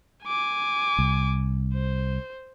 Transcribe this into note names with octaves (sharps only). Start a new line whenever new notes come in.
G#5 D6
C2
C5